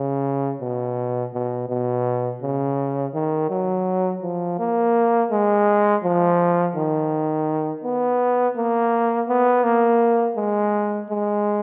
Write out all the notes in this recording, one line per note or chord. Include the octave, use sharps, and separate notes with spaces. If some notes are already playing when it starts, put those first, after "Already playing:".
Already playing: C#3
B2
B2
B2
C#3
D#3
F#3
F3
A#3
G#3
F3
D#3
B3
A#3
B3
A#3
G#3
G#3